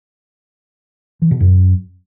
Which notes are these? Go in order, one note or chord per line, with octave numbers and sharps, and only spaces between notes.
E3
B2
F#2